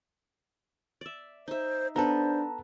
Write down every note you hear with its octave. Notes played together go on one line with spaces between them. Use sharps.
D5 E5
D#4 C5 E5
B3 D4 A4 B4 C5 A5 A#5